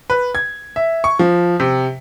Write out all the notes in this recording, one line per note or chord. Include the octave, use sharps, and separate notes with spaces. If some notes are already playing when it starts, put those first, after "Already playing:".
B4
G#6
E5
C#6
F3
C3